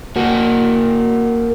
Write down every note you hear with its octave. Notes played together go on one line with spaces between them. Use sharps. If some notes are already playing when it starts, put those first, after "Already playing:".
A#3 F#4